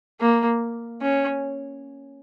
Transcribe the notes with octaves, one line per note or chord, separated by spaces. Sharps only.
A#3
C#4